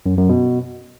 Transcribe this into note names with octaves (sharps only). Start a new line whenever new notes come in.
F#2
F#2
B2